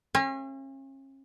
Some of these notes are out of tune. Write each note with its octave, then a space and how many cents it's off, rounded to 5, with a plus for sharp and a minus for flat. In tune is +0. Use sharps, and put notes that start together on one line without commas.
C#4 -40 F5 -40